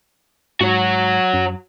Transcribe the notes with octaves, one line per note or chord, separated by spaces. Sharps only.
G#2 F#3 F#4
F#2